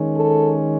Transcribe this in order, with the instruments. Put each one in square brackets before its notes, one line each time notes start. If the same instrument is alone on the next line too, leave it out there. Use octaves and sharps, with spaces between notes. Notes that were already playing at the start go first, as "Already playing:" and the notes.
Already playing: [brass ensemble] D#3 G#3 C#4
A4